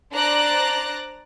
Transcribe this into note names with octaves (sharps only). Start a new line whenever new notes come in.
D4 C5 D5 A#5 F#6 A#6